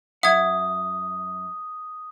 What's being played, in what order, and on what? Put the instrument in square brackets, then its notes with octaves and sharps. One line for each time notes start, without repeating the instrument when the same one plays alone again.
[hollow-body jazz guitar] F#2 F#5 [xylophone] E5 G#6 [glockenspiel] D#6